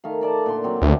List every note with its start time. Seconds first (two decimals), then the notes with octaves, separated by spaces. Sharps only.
0.04 D#3 A3 F5
0.21 A4 D5 A5
0.46 A#2 D3 C6
0.64 F#3 C4
0.82 D2 D4 E4